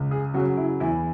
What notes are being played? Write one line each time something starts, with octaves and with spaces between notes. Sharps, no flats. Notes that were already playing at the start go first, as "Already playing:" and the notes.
Already playing: C#2
G#4
C#3 F#3 F#4
E4
E2 E4